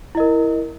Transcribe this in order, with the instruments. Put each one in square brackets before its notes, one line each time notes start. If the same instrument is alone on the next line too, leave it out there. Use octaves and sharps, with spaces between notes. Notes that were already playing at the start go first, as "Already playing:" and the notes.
[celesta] E4
D#5
A#4